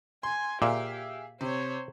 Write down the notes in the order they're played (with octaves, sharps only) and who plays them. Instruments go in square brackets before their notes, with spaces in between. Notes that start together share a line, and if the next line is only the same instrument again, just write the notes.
[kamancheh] G#5 [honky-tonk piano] C6
[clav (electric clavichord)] A#2 [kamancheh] G4 [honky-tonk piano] G#4 E5 F5
[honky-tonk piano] C3 [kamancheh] C5 C#5